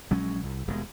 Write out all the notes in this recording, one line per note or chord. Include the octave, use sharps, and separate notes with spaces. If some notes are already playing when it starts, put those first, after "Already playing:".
A#1 F#3 G#3 C#4
C2
D#1 B2 G#3